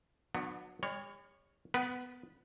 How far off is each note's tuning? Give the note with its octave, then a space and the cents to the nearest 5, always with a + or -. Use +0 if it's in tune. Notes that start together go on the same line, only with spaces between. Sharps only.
F#3 -30 B3 +0 D4 +35
G3 +45 C#5 +0
B3 +15 B4 -20